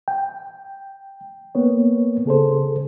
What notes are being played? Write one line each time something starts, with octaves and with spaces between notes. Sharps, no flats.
G5
A#3 B3 C#5
C#3 G#4 A4 C5